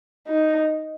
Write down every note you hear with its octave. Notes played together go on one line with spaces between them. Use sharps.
D#4